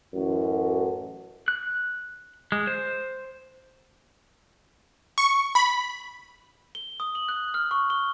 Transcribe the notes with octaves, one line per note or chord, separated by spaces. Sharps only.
A1 F#2 A2 F#4
F#6
G#3
C5
C#6
B5
G7
D#6
F#7
F#6
F6
C#6
G7